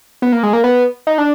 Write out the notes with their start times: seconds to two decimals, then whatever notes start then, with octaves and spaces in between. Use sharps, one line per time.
0.22 B3
0.33 A#3
0.43 G#3
0.53 A#3
0.64 B3
1.07 D#4
1.18 D4